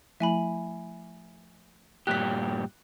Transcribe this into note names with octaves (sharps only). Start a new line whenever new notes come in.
F3 A3 E4 E5 G#5 B5
G2 A#2 G4 F#6 B6